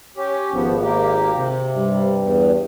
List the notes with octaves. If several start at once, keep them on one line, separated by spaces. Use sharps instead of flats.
C#4 G4
G#1 F3 B3
A#3 G4
C3
G2 G3
E2